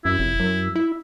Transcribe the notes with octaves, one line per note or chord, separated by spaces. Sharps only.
F#2 E4
F1
F#2
E4